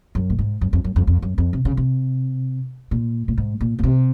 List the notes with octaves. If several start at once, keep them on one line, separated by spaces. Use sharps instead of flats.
F#2
A#2
G#2
F#2
F2
F#2
F2
F2
F#2
F2
C3
C#3
C3
A#2
A#2
G#2
A#2
A#2
C3